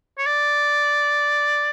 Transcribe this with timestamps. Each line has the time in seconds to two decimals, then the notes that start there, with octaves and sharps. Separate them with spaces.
0.18 C#5
0.26 D5